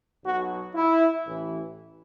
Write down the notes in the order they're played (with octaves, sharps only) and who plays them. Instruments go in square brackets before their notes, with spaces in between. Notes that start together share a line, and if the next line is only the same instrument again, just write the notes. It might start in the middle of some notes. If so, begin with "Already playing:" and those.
[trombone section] B1 B2 F#3 F#4
E4
A1 A2 E3